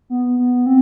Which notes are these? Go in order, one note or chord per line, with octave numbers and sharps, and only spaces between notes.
B3
B3
C4